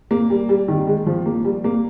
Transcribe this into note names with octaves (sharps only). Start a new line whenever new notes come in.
A#3
G3
G3
D#3
G#3
F3
A#3
G3
A#3